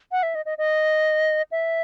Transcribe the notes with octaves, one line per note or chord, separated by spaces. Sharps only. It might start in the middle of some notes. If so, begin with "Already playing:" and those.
F#5
E5
D#5
D#5
D#5
E5